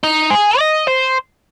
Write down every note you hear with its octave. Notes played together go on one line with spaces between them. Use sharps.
D#4
G#4
D#5
C5